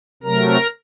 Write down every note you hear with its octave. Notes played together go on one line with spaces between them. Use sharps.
C3 F#3 A3 A#4 A#5